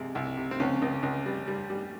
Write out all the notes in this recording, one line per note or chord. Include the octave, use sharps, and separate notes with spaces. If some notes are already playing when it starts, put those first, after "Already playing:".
Already playing: C2 C3 G#3
C2
C3
C4
C#2 C#4
C#2
C#2
G3
G3
G3